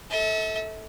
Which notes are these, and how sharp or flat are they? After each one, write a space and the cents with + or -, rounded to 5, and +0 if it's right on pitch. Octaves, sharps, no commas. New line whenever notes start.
A4 +0 E5 -45